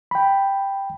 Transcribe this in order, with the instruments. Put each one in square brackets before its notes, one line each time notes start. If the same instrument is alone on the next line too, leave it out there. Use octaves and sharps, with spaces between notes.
[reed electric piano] G5 B5